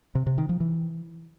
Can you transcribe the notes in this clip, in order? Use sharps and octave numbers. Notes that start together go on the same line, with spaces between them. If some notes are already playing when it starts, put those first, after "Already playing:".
C3
C3
D#3
F3
E3